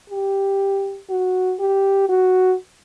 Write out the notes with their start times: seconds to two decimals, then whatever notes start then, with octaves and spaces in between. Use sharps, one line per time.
0.10 G4
1.10 F#4
1.59 G4
2.09 F#4